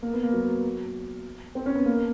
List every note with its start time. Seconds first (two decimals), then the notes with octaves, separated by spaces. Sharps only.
0.02 A#3
0.14 B3
0.23 A#3
0.33 F#3
1.55 C4
1.66 C#4
1.75 B3
1.86 A#3